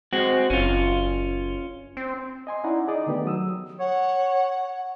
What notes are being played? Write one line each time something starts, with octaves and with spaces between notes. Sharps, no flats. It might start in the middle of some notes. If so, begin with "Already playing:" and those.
G#3 C4 F#4
F#1 C#4 F4
C4
D#5 G#5 C6
C#4 D#4 E4 D5 F#5 A#5
D#4 G#4 D5 D#5
D3 D#3 A3 B3 G4
F#3 D#6 E6
C#5 F#5